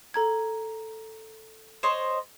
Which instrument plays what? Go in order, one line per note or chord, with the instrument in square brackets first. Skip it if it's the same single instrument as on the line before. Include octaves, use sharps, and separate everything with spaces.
[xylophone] A4 A#5 G#6
[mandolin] C5 C#5 D#5 [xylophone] E7